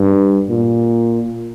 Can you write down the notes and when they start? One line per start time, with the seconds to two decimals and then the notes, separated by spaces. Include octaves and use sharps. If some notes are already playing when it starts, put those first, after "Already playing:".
Already playing: G2
0.49 A#2